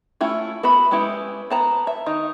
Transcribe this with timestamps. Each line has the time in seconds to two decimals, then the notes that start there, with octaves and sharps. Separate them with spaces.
0.21 A3 C#4 E4 F4
0.63 B3 F#4 E5 B5
0.91 G#3 B3 C#4 E4 G4
1.50 B3 A5 A#5
1.87 E5
2.06 D#3 D#4